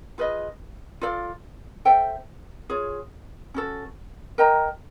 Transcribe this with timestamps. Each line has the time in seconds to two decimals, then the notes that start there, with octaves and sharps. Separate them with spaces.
0.18 F4 G#4 B4 D#5
1.01 F4 A4 D5 F5
1.85 A4 C5 E5 G5
2.70 F4 G#4 C#5
3.54 C#4 F#4 A4
4.38 A#4 D#5 G5 A#5